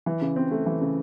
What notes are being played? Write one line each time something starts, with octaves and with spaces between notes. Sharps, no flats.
E3
C#3
C4
A3
E3
C#3